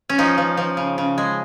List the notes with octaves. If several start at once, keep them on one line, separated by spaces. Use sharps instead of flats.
C#4
F3 D#4
F3
F3
C#3
C#3
G#3